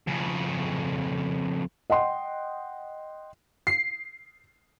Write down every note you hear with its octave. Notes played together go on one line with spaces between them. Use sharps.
F2 C#3
D#5 F#5 G5 C6
C7